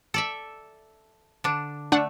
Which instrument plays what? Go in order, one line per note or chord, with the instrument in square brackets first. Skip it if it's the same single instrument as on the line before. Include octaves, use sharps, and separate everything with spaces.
[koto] A4 D5 E5
D3 D4
[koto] A3 [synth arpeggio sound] D4 F#5